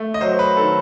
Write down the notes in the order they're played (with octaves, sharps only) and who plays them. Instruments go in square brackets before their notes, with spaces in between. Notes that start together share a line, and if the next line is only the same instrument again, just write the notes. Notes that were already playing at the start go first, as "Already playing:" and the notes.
Already playing: [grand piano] A3
D#5
F#3 C5
B4
D#3 A4